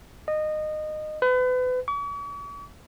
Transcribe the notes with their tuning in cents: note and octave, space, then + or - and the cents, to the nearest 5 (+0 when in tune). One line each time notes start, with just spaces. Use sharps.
D#5 -20
B4 +35
C#6 +45